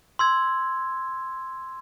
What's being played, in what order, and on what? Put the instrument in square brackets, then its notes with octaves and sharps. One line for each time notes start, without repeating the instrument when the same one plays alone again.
[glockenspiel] C6 E6 G#6